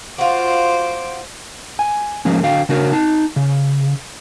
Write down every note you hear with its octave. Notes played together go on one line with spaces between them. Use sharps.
F4 F#4 C5 D6
G#5
F3 G#3 A#3 C#4
D3 F#4 F5 G5
C#3 D4 F#4 A#4 C#5
D#4 A5
C#3